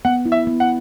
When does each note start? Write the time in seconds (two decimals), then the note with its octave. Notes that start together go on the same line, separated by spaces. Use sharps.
0.05 B3 F#5
0.26 E4
0.32 E5
0.47 B3
0.60 F#5